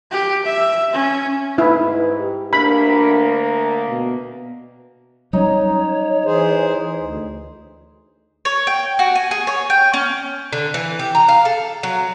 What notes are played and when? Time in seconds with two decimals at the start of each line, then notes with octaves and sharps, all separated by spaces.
0.12 G4
0.46 E5
0.93 C#4
1.58 G#2 E4 B4
2.20 G4
2.53 D2 A#3 D4 B5
3.88 B2
5.33 F#3 G3 C#4 D#4 C#5
6.25 E3 G#4 C5
6.99 D2
8.45 C#5
8.67 G5
8.99 F#4
9.15 G#5
9.31 G#4
9.47 C#5
9.70 G5
9.94 C#4
10.53 D3
10.74 E3
10.99 G4
11.15 A#5
11.29 F5
11.45 A4
11.83 F#3